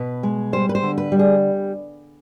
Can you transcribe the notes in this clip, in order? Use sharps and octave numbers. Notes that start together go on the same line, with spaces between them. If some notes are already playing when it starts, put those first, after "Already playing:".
Already playing: B2 B4
G#3
G3 C5
B4
C5
D3
B4
G3
G#4